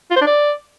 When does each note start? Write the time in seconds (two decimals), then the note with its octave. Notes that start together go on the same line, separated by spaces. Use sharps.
0.11 F4
0.16 C5
0.21 D4
0.27 D5